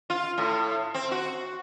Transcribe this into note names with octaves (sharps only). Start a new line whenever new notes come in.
F4
A2
C4
F#4